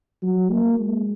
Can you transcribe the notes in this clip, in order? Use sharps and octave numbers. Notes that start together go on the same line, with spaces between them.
F#3
A#3
G#3